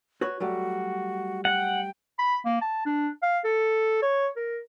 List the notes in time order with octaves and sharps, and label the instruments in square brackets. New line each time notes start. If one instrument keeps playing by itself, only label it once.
[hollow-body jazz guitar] F#4 B4 C#5
[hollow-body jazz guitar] F#3 G3 A3 [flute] F#4
[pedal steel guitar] F#5 [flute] G5
[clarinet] B5
A#3
A5
D4
F5
A4
C#5
A#4